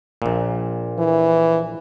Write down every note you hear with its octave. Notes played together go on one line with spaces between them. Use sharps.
A#1 A#2
E3